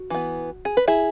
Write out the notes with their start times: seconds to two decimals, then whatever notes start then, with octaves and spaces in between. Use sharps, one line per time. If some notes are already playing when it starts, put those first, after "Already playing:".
Already playing: F#4
0.10 E3 B3
0.65 G#4
0.77 B4
0.87 E4 G#4